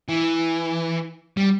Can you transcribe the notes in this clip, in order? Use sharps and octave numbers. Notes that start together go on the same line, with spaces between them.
E3
G3